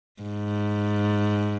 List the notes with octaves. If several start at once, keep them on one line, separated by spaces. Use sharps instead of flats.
G#2